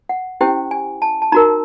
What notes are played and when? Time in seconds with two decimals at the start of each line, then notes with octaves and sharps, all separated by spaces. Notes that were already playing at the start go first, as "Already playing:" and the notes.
0.09 F#5
0.41 C#4 E4 G4 C5 G5
0.71 G#5
1.02 A5
1.22 A5
1.32 D#4 F#4 A#4 A#5